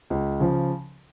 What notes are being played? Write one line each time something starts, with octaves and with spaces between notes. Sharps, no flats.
C#2
C#3 F3